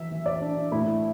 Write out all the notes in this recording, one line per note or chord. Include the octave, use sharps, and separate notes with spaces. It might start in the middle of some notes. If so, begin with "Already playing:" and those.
Already playing: E3 E5
E3
D5
D4
A2 E4